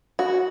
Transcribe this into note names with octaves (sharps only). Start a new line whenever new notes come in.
F#4